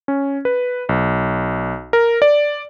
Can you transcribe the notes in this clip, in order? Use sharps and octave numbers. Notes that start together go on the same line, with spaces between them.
C#4
B4
B1
A#4
D5